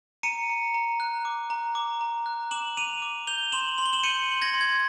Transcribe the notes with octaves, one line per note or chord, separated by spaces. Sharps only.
A#5 C#7 D#7
A#5
A#5
F#6
D6
A#5
D6
A#5
F#6
D6 E7 F#7
D6 D#7 F7
D6
G6 F7 G7
C6 E7 F#7
C6 F#7
G7
E7 F#7
G6 C#7 D#7
C6
G#6 A#6
C6
G#6